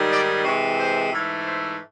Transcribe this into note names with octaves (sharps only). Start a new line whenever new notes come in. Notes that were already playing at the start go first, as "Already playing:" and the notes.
Already playing: G#2 D#3 G3
D5
C3 E3 G#3 C#5
C5
G#2 E3 A3
C5